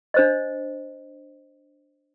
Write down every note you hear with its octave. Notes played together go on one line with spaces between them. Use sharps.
D4 C5 D#5